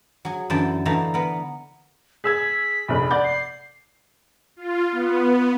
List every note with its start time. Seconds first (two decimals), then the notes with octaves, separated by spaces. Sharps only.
0.25 F#3 G#4
0.50 F#2 D3 E3 G5 A5
0.85 D3 E3 A3 D#4 F5 A#5
1.14 B3 A#4
2.24 G#4 E6 G#6 B6
2.88 F1 A#1 B5
3.11 D5 F#5 G6
3.24 C7
4.56 F4
4.92 B3